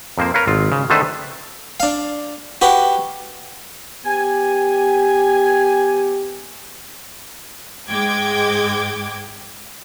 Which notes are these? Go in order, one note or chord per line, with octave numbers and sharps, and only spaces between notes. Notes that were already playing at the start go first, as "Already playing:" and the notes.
F2 A#3 C5
A#4 B4 C#5 F5
G#1 F4
C#3
D3 D#3 A3 A4 B4 C5
D4 F5
F#4 G4 B4 F#5
B3 G4 G#5
G#2 G#3 G5 D6 G#6